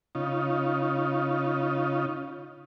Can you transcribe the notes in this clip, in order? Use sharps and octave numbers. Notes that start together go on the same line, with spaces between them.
C#3 D#4 F4